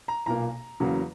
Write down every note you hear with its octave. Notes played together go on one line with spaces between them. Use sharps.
A#5
B1 A#2 A#3 A#5
E2 C#3 F#3 A#3